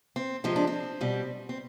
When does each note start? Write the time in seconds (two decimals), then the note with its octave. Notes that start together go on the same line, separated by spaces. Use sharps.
0.16 C4
0.44 C3 F3 G#3 C4
0.56 D4
0.67 C4
1.01 B2 G3
1.49 C4